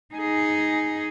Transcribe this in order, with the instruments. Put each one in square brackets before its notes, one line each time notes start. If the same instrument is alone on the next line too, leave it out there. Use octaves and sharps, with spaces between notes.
[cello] D#4 G#4